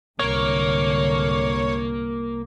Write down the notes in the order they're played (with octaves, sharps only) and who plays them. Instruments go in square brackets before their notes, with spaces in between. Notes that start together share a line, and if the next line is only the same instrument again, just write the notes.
[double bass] C2 [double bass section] G#2 D3 [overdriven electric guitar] A#3 [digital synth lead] C#5